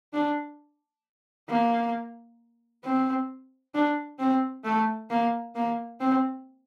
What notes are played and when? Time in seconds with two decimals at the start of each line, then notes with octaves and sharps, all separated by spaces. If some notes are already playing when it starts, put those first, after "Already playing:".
0.14 D4
1.49 A#3
2.85 C4
3.75 D4
4.19 C4
4.65 A3
5.10 A#3
5.56 A#3
6.00 C4